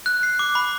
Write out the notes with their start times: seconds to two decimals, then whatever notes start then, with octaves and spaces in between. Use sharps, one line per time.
0.06 F#6
0.23 C7
0.39 D6
0.55 B5